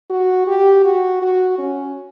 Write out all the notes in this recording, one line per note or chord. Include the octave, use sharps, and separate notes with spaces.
F#4
G4
F#4
F#4
C#4